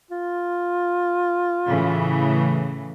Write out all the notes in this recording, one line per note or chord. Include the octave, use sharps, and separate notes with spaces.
F4
A2 C#3 E3